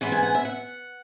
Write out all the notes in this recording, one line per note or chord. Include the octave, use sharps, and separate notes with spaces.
G#2 E3 B3
G#5
F#5
E5
F#5